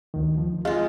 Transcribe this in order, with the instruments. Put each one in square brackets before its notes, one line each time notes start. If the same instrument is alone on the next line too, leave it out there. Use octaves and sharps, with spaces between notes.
[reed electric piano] D2 D#3
F3
[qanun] G#3 F4 [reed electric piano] F5